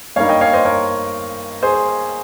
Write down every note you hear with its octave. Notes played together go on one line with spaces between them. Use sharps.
G2 G3 A#3 D#4 C#5 F5
D#5 G5
C#5 F5
C5 D#5
A#4 C#5
G#4 C5